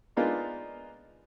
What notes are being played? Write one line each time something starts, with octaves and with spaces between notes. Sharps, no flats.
G#3 A#3 B3 D4 D#4 F4